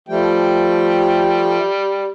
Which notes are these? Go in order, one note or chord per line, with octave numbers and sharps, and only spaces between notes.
F3 G3 A3 G5